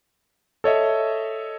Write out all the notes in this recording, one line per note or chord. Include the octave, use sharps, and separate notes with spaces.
A4 C#5 D#5 E5